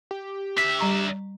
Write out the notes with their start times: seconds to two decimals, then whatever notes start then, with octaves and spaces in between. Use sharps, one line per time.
0.11 G4
0.58 D4 E5 B6
0.79 G3 A#5 C#6